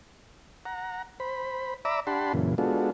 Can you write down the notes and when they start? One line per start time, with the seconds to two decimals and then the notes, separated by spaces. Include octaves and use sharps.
0.65 F#5 A#5
1.20 C5 B5
1.85 D5 E5 A#5 B5 D6 E6
2.07 D4 G4 F#5 A5 B5 C6
2.34 F#2 A#2 C#3 E3
2.58 G#3 B3 D4 F4 F#4 A4